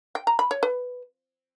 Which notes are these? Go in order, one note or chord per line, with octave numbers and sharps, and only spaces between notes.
G5
A#5
B5
C#5
B4